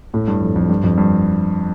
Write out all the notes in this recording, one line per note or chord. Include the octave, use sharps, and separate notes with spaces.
A2
G2
F2
F2
G2
F2
G2